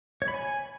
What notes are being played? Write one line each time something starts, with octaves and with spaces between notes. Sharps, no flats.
C#5
B5
G#5